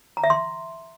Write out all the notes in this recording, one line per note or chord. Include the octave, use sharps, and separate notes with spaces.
A#5
E5
C6